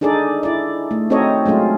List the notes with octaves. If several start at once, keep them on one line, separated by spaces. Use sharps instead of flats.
D4 D#4 G#4 A4 D5
E4 D5
A3
C4 D#4 F#4 A4 C#5 D#5
F#3 G#3 A3 C#4 F4